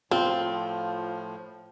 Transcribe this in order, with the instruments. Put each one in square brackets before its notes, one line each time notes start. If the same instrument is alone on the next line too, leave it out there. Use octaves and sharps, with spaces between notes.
[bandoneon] A2 F3 [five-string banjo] C4 [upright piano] F4